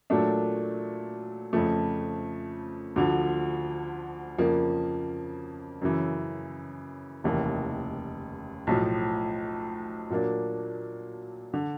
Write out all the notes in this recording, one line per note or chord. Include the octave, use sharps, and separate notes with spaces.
A#2 F#3 A3 D4
F2 C#3 F3 A3
D2 D3 F3
F2 C#3 F3 A#3
F#2 C#3 E3
F1 D#2 C#3 E3
B1 A2 F3
A#2 F#3 A#3 D4
D3